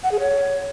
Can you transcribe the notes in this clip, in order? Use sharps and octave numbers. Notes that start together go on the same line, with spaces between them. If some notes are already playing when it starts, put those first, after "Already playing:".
F#5
G#4
C#5